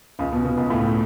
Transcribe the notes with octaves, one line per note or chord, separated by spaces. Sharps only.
C#2 C#3
B2
B2
C#2 C#3
A2 A3